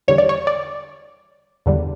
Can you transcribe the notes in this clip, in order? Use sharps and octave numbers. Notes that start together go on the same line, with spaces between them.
E2 D3 G3 C#5
D5
C#5
D5
E2 D3 G3